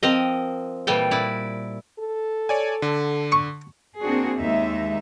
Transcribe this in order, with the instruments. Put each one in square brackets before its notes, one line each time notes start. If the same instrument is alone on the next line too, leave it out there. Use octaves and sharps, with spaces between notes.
[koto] F3 C4 A#4 D#5
A#2 E3 G3 A4 G5
A#2 E4 D5
[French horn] A4
[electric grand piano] C#5 D5 G#5
D3
[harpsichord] C#6
[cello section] A#3 C4 D4 F#4 G#4
D#2 G#3 D#4 E5